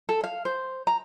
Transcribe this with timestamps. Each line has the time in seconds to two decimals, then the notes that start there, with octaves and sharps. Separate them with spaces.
0.09 A4
0.24 F5
0.45 C5
0.87 A#5